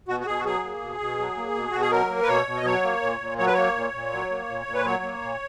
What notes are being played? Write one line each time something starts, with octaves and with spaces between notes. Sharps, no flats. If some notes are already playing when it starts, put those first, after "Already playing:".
B2 F#4
F#4
B2 G#4
F#4
F#3 G#4
A#3
B2
B2
F#3
A#3
B2
B2 F#4
G#4
F#3 A#4
A#3
B4
B2 C#5
B2
D#5
F#3 C#5
A#3
A#2
A#2
F#3 C#5
B4
A#3 C#5
A#2
A#2
F#3
A#3
A#2
A#2
B4
F#3 C#5
A#3
A#2